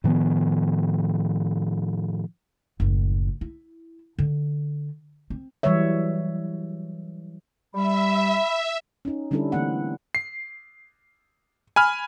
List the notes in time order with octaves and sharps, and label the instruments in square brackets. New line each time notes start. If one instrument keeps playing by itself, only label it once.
[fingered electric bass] A2 D#3 F3 B3
[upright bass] F#1 A2
E4
D3
C4
[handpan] E3 F#3 G3 B4 C#5 E5
[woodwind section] G3 [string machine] E5 [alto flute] B5
[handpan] C#4 D#4
D3 G3 C#4 D4 E4 A4
D3 E3 A3 A#3 C4 F#5
[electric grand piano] C7
G#5 B5 F6